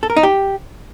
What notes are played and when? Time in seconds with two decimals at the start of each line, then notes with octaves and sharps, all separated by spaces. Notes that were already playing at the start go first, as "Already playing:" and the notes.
0.03 A4
0.10 A#4
0.17 D#4
0.23 G4